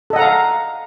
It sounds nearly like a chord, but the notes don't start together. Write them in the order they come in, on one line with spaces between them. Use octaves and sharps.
A4 D#5 F#5 A#5 F5